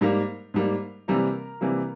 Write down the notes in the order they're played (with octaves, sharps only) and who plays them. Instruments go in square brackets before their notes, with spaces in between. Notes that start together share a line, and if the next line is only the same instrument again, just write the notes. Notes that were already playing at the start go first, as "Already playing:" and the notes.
[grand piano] G#2 G3 A#3
G#2 G3 A#3
C3 E3 G3 A#3 A#4
C3 E3 G3 A#3